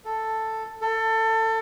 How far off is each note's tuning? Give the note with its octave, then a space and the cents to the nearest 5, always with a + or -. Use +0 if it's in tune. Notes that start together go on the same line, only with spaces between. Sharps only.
A4 +5
A4 +25